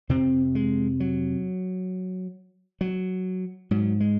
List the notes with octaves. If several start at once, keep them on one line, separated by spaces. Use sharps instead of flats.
F2 C3 C4
G#3
F#3
F#3
G#2 F#3
G#3